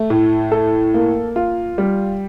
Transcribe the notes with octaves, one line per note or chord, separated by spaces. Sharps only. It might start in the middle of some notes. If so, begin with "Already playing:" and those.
Already playing: A3
A2
A4
A#3
F4
G3